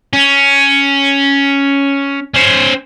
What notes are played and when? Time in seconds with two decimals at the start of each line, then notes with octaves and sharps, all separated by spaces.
0.13 C#4
2.34 C#4 C5